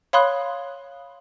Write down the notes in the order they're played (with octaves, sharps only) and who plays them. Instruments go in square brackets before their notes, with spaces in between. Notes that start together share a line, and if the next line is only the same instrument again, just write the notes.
[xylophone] C#5 F5 B5 C6 D#6 F#6